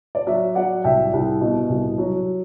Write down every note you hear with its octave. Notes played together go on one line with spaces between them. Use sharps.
D5
F#3 E5
F#3 D5 F#5
C2 E5 G5
C2
B2
C2
F#3